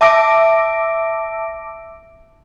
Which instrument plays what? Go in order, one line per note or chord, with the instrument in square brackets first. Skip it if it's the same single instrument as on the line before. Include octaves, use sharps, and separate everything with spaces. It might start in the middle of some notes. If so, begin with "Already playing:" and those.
[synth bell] E5 A5 D6 E6 A#6 D7